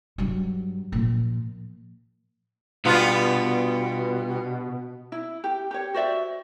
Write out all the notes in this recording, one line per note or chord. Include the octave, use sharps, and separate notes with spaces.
G2 F#3
A#2 F3
G2 B2 B3 F4
E4
G4
G4 C#5
F#4 C5 D5 E5